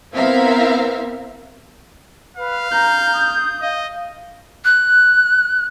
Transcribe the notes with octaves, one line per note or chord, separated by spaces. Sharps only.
B3 C4 E4 A#4 E5 F5
B4 F5
A#5 G6
D#6
D#5 F5
F#6